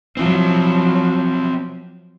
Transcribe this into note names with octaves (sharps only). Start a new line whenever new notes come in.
F3 F#3 C4 E4